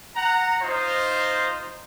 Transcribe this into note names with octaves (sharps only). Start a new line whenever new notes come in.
F#5 A#5
D#4 F4 C5